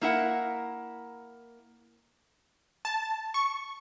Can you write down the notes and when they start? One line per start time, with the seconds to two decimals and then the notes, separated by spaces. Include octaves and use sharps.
0.01 A#3 E4 A#4 F#5
2.85 A5
3.34 C#6